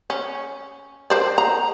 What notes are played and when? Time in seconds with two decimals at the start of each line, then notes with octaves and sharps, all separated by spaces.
0.10 C#4
1.10 A#4 C5 D5
1.38 A#5